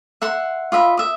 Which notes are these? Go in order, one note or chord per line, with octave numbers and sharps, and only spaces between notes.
E5 F#5 C6
F4 D#5 E5 B5
E5 D#6